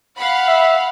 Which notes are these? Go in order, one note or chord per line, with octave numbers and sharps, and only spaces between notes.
F5 F#5 B5
E5